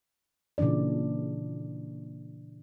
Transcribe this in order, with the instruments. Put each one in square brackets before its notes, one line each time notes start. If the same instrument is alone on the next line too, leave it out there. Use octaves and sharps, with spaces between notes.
[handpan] A#2 C#3 E3 D4 D5